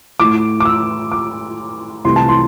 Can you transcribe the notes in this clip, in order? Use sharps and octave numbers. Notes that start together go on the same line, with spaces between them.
A2 A3 D6
D6
E6
D6
C2 C3 E3 A3 C6
A5
C6